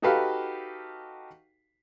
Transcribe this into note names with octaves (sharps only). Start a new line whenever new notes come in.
D#4 F#4 G4 A4 B4 F5